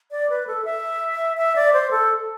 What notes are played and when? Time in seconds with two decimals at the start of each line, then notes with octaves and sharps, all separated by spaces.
0.11 D5
0.30 B4
0.47 A4
0.65 E5
1.37 E5
1.56 D5
1.73 C5
1.91 A4